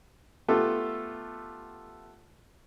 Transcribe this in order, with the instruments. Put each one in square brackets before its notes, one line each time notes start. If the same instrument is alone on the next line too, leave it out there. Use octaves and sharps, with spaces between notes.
[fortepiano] A3 B3 F4 G4 A4